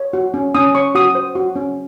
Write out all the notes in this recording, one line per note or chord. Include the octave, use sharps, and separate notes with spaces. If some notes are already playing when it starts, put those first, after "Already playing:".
Already playing: C#5
F#4
C#4
C#4 D#6
C#5 C#6
F#4 D#6
C5
F#4
C#4